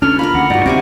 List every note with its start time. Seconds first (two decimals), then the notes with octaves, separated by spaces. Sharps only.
0.02 C#4 D4 A4 B4 F6
0.19 A#3 F4 A#4 B5
0.34 D2 F#5
0.50 G2 D#4 F#4 D5
0.66 D2 C3 C4 G4 G#5